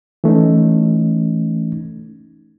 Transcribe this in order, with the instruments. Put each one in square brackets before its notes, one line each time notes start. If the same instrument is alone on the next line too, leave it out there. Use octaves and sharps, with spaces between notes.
[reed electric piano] E3 A3 C#4 D#4